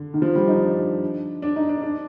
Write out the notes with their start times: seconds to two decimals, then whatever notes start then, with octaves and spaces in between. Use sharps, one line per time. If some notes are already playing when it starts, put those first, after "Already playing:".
Already playing: D3
0.14 D#3
0.22 F3
0.35 G3
0.48 D#4
0.62 D4
1.42 D4
1.56 D#4
1.69 D4
1.82 D4